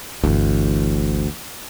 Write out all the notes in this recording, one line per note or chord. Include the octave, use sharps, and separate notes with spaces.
G1 D2 E3